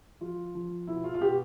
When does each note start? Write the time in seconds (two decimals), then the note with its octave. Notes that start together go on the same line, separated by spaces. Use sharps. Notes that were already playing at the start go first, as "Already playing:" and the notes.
0.21 F3 F4
0.55 F3
0.87 B2 E4
1.04 F4
1.14 F4
1.21 B2 G4